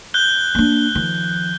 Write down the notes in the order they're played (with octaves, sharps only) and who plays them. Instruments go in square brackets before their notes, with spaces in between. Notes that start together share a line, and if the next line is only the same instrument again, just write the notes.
[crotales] F#6 G6 G7
[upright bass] A#3 D4
D#3 F3